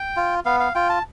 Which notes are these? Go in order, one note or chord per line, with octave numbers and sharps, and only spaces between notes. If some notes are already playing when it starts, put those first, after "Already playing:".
Already playing: G5
F4
B3 F5
F5
F4 G5
A5